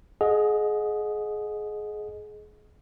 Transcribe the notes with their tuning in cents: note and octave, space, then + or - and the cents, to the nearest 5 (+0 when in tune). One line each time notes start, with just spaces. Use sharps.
G#4 +25 D#5 +0 F#5 -35